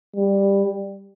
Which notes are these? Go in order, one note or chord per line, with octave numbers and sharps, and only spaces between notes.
G3